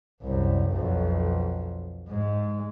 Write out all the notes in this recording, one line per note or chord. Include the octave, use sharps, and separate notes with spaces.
C2 F#2
B1 F2
G#2 G#3